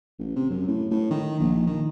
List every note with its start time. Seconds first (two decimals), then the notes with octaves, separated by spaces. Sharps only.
0.19 A1
0.36 C3
0.50 F#2
0.68 A2
0.91 A2
1.11 D#3
1.40 A#1
1.67 D#3